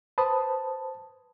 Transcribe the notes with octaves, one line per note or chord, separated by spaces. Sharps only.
B4 C5 A5 B5 D#6